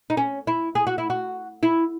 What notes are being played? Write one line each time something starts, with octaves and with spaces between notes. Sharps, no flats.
D#4
C#4
E4
G#4
F#4
E4
F#4
E4